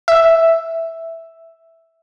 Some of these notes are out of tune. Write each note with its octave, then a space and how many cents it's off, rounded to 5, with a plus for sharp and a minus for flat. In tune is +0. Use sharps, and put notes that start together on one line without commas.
E5 +5